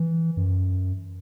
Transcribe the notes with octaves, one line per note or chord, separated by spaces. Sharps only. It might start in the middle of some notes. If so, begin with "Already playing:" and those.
Already playing: E3
F#2